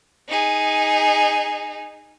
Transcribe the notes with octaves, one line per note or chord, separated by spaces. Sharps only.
D#4 G#4